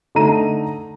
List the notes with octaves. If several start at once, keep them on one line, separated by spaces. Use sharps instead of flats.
D3 A3 D#4 A#5 D#7